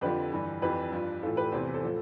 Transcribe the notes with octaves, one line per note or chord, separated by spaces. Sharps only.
F2 D3 F3 G4 B4
G2 E3
F2 E3 G4 B4
G2 F3
A2 E3 F4 A4
G4 B4
E2 C3 E3 C5
A4 C5
A2 F3